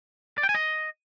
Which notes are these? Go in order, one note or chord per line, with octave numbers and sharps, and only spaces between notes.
D5
G5
G#5
D#5